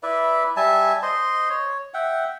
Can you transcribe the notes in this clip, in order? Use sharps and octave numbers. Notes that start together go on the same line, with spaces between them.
E4 B4 D5 E5
G3 E5 G#5 A5
C5 D#5 C6
C#5
E5 F#5 G5